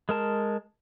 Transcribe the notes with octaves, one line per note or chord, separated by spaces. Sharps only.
G#3 A#4 A5